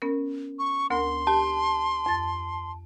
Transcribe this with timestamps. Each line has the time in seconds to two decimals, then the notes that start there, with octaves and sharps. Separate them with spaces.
0.02 B3 C#4 A#4
0.59 C#6
0.90 D2 B3 A#4 C6
1.27 G4 A5
2.06 F2 A6